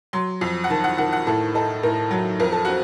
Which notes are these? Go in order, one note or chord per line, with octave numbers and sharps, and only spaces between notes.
F#3 C6
F2
F#5
D#3 A5
F#5
D#3 F#5
F#5
A2 A4
D#4 A4
A2 A#4
F#3
F2 A#4
A4
C4 F#4